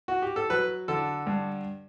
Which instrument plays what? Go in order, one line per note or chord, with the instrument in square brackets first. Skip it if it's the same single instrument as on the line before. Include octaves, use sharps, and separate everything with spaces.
[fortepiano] F#4
G4
A4
F#3 B4
D3 A4
G2